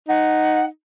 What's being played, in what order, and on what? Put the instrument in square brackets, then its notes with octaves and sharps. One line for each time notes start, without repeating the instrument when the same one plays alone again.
[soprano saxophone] D#4 [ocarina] F#5